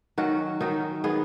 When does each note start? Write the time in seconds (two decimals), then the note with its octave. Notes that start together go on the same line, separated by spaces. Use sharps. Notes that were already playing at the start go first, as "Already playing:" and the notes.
0.18 D#3 F#3 C#4 F#4
0.60 D#3 F#3 C#4 D#4
1.04 D#3 B3 G#4